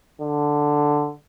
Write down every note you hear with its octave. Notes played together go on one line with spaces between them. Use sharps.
D3